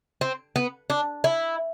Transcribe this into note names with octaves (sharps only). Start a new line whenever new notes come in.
C4
B3
D4
E4